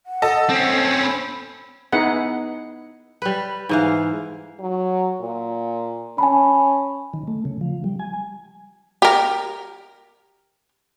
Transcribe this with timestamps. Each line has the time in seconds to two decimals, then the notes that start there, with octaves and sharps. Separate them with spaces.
0.06 F#5
0.22 A4 D#5
0.50 C4 C#4
0.89 C5
1.02 B5
1.92 B3 D#4 E4 G#4 F#5
3.22 G3 B4
3.69 G#2 E3 F5
4.60 F#3
5.21 A#2
6.18 C#4 G#5 A5 B5
7.13 D#3
7.28 A3
7.45 C#3
7.61 F3
7.84 G3
7.99 G#5
9.02 G4 A#4